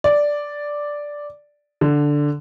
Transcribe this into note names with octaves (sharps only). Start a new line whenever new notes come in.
D5
D3